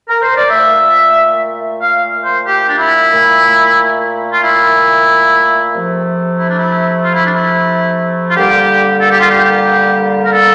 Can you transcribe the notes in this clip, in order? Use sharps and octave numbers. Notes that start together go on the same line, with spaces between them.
A#4
C5
D5
A#2 A3 E5
F5
C5
G4
D4
E4
A#2 A3
F4
E4
C3 F3 A3
E4
D4
E4
F4
E4
D4
E4
F4
D3 G3 A#3 G4
A4
G4
F4
G4
A#4
A4